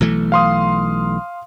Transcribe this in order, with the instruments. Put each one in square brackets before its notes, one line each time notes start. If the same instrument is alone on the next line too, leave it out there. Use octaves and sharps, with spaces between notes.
[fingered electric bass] B1 E3 A3
[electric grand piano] F5 C6 D#6